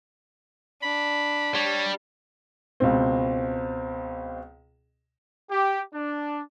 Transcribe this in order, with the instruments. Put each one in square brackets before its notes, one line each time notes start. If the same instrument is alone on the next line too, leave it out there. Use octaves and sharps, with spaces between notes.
[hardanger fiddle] D4 [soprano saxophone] B5
[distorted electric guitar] G3 [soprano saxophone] C#5
[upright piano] C#2 B2 C4
[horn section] G4
D4